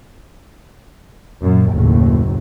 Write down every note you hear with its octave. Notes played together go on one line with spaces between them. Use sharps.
F#2 A#2
F#1 D#2 A2 F#3